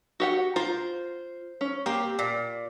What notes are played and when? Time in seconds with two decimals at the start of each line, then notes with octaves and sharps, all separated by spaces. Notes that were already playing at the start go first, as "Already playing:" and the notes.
0.20 F#4 G4 F#5
0.56 F4 A#4 C5
1.61 C#4
1.86 A#3 C4 G4
2.19 A#2